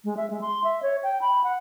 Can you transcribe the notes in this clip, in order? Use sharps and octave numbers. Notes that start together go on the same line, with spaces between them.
G#3
E5
G#3
C6
E5
C#5
G5
B5
F#5